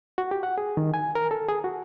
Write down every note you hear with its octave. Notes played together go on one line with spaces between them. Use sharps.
F#4
G4
F#5
G#4
D#3
G#5
A#4
A4
G#4
F#4